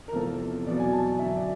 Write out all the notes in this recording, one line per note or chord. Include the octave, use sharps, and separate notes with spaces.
A#4
E2 C3 F3 A4
E2 B2 F#3 D5
G#5
A5
G#5
F#2 D3 F#3 E5
D5